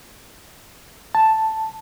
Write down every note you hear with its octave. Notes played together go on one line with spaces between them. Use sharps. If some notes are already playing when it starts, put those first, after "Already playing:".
A5